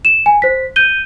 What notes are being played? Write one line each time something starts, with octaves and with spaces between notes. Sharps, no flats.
E7
G#5
C5 B6
G6 D#7 G7